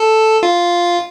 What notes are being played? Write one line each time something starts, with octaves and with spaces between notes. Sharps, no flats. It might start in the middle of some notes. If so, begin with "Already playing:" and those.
Already playing: A4
F4